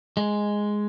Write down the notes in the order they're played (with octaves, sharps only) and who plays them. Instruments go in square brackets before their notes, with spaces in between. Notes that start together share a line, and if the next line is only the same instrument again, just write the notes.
[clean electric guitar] G#3